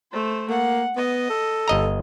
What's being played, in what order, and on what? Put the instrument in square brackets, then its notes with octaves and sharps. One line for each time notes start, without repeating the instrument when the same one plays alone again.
[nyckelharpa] A3 C5
[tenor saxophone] A#3 [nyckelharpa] F#5
[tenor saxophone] B3 [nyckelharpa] D#5
[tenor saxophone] A4
[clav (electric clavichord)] G1 D#5 A#5